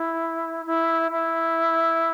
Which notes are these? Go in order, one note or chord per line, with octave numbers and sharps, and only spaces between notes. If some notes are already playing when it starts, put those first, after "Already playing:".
Already playing: E4
E4
E4